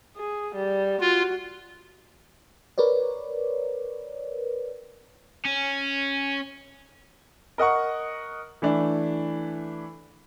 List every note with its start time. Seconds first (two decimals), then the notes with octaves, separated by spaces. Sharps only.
0.17 G#4
0.55 G3
1.00 F4 F#4
2.78 A#4 B4 C#5 D5
5.46 C#4
7.58 A#4 D#5 F#5 C#6
8.62 E3 A3 D4